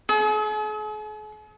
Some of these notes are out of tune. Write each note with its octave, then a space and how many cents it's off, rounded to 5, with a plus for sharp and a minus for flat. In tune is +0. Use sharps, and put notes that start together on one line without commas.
G#4 +45